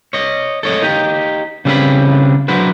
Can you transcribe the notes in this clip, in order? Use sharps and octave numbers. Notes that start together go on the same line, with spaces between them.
C#5 D#5
A4 C#5 D#5
D#4 G4
C#3 G3 C4 D4 B4 B5
F#3 D4 E4 F#4 B4 C5